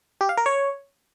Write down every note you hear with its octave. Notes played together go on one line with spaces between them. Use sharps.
G4
F5
A#4
C#5